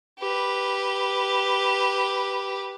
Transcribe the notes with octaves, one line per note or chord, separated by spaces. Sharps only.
G4 B4